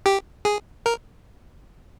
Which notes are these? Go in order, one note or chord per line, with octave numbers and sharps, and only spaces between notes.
G4
G#4
A#4